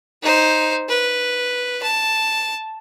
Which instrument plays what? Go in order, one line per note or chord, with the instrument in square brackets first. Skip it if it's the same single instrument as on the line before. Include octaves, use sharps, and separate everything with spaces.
[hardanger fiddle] D#4 C5
B4
A5